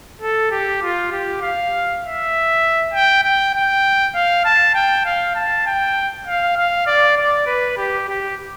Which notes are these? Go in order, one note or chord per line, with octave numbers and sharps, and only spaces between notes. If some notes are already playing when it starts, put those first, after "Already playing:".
A4
G4
F4
G4
F5
E5
G5
G5
G5
F5
A5
G5
F5
A5
G5
F5
F5
D5
D5
B4
G4
G4